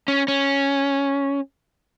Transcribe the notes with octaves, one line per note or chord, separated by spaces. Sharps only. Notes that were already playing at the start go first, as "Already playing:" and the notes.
C#4
C#4